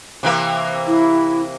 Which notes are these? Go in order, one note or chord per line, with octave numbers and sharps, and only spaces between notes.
C3 E3 A#3
E4